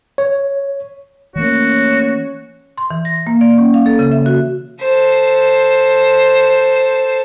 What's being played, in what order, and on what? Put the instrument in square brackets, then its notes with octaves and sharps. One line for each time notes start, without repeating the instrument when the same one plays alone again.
[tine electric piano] C#5
[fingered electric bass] E3 A3 A#3 [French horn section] C#4 C#5 [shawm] F#4
[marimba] C6
E3
A#6
A#3
D5
C#4
F5
A4
C#3
E5
F#4
[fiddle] A4 C5